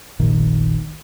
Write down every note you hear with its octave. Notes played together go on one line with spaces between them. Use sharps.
F1 A#1 A#2 D#3